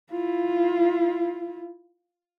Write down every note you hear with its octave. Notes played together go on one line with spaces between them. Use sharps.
E4 F4